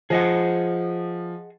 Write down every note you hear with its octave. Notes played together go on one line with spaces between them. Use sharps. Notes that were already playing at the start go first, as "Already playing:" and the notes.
F3 G#4 D#5 F#5